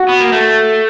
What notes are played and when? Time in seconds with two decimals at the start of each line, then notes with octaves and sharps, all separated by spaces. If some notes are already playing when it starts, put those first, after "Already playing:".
Already playing: F#4
0.09 B3
0.20 A#3
0.32 A3